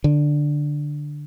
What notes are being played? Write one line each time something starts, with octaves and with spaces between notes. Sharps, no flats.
D3